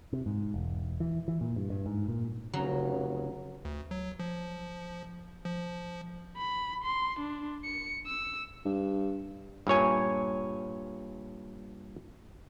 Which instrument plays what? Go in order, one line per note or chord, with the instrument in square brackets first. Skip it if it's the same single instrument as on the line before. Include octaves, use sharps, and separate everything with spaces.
[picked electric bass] C3
G#2
E1
E3
E3
A#2
G2
G2
G#2
A#2
[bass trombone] F1 [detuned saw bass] C#3 [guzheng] F#3
[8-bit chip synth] D2
F#3
F3
F3
[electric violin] B5
C6
D4
C#7
E6
[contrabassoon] G2
[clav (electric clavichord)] G2 A#2 C#5 G#5